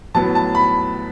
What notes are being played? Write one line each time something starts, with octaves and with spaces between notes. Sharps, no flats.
A2 F#3 B3 A5
A5
B5